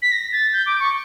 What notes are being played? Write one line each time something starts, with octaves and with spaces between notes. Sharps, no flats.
B6
A#6
A6
G6
D6
C#6